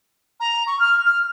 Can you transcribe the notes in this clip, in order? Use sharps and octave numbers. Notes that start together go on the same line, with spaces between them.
A#5
C#6
F6
F6